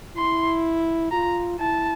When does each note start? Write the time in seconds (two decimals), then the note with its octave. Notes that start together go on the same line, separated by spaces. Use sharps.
0.17 E4 C6
1.12 F4 A#5
1.60 E4 A5